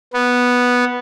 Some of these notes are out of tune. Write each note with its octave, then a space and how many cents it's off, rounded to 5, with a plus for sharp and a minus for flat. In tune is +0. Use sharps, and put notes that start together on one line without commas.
B3 -5